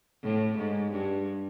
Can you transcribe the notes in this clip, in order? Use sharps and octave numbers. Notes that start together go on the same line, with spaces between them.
A2
G#2
G2